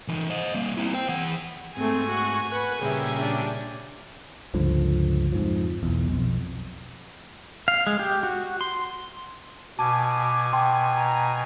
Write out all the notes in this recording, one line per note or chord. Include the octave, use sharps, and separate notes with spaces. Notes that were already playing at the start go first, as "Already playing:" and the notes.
E3 D#4
C5 D#5
G3 A#3
C4 E4
C5 G5
E3 F#5
G#2 A3 C4 G#5
F#4
B4 F#5
A#2 C#3 G3 G#4 E5
D4
C#2 G2 D3 F3
F2 G#2 F3
B1 E2
B1 F2
F5
G#3
G4
F#4
C6
B2 G#5 A5 D6
G5 A5 C6
A#5